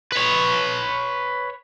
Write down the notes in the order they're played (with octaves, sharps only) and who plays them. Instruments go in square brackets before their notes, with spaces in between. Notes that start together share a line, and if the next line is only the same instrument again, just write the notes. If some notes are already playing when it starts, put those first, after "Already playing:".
[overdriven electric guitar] B4 C#5